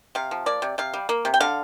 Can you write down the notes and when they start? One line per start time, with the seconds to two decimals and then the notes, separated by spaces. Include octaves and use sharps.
0.15 C3 F5
0.31 F3
0.46 A#3 D5
0.62 C3
0.78 C3 F5
0.94 G3
1.09 A#3
1.25 C3
1.34 G5
1.40 D3 F5